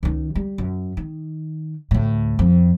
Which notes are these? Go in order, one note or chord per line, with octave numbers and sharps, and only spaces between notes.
C#2 D#3
G3
F#2
D#3
D2 A2
F2